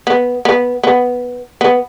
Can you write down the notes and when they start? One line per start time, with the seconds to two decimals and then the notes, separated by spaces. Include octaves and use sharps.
0.07 B3
0.45 B3
0.83 B3
1.61 B3